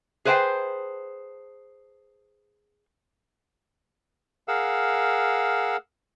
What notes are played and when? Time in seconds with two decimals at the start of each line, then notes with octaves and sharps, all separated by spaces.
0.25 G#4 B4 C5 E5 G5 A5
4.48 G#4 A#4 F5 F#5 E6